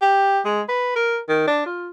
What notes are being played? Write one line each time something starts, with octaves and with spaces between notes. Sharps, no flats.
G4
G#3
B4
A#4
D#3
D4
F4